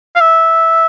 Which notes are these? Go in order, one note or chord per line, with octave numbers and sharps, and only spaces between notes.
F5
E5